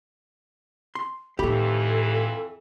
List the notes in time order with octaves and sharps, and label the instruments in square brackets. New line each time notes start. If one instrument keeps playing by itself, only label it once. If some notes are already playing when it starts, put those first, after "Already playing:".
[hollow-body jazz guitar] C6
[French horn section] F2 E3 [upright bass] A2 D#3 [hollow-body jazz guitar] G4 B5 [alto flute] A4